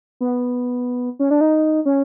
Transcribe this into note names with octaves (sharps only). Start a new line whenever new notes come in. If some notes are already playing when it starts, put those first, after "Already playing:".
B3
C#4
D4
D#4
C#4